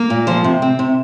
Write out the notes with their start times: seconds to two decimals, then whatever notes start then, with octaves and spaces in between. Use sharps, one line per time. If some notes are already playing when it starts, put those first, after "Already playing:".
Already playing: A#3
0.10 A#2
0.27 F3 C5
0.44 C3
0.62 C4
0.79 C3